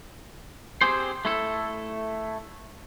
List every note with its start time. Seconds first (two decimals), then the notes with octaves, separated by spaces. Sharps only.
0.81 C4 G4 G#4 C5
1.25 A3 E4 A4